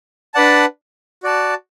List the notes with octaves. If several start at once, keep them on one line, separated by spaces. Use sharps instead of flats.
D4 B4 D5 F#5 A5
F#4 D5 A5